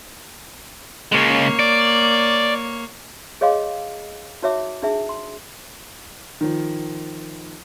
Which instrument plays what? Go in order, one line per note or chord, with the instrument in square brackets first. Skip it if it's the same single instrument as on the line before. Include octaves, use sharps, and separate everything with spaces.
[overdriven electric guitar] C#3 G#3 [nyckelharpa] A#3 C#5
[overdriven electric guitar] D5
[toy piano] G#4 C#5 D#5 F5 C6 D6
D#4 F#4 C#5 E5 D6
D4 D#4 G#4 E5
C6
[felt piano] D#3 F3